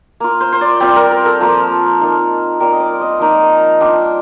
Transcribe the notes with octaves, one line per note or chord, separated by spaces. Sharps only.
A#3 F4
C5
C5
D5
G3 C4 F4 C5
A#4
A#4
A4
F3 A#3 F4
A#3 D#4
G3 C4 F4 A#4
D#5
D5
D#5
F3 A#3 D#4
G3 D4 F4